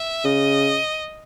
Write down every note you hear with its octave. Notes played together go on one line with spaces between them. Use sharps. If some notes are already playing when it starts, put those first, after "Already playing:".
Already playing: E5
C#3 D#5